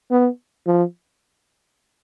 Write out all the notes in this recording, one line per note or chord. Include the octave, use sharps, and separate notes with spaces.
B3
F3